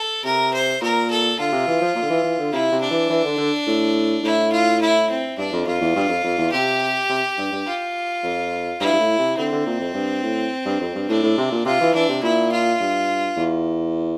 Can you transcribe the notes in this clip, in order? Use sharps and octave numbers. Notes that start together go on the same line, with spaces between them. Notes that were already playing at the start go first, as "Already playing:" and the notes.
Already playing: A4
C3 A#4
C5
A#2 A#4
A4
D3 F4
C3
E3
F3
A#2
D3
E3
E3
D3
C3 E4
C3
D4
E3
E3
D3
D3
A2
A2 E4
F4
E4
C4
G2 D4
F2
F2 F4
E2
G2
F2
F2
E2
C3 G4
C3
G2
G2
F4
F2
G2 E4
G2
A2
C3
D3 C4
D3
A#2
F2
G2
A2
G2
F2
G2
A2 D4
A2
C3
A#2
C3 F4
E3
E3 D4
C3
A#2 E4
F4
G2
E2